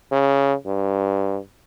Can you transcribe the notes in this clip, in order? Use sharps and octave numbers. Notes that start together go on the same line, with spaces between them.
C#3
G2